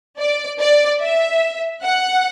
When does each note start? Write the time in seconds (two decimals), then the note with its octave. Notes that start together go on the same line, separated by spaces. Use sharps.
0.18 D5
0.60 D5
1.01 E5
1.83 F#5